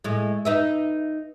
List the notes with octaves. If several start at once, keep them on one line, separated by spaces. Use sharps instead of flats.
A2 G#3
D#4 B4 E5